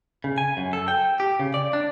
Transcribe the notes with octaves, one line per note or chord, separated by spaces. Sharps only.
C#3
G#5
F#2
A4
G5
G4
C#3
D5
D4